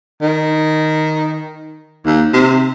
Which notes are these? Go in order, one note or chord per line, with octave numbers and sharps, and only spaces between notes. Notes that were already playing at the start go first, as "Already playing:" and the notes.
D#3
D#2
C3